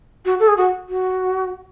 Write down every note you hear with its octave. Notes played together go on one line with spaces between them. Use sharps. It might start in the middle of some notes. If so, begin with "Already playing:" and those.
F#4
A4
G#4
F#4
F#4